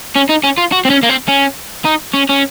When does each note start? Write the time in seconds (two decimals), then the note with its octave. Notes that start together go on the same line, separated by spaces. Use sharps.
0.15 C#4
0.29 D#4
0.43 C#4
0.58 F4
0.72 F#4
0.85 C4
0.90 C#4
1.03 A#3
1.10 C4
1.28 C#4
1.85 D#4
2.14 C#4
2.29 C#4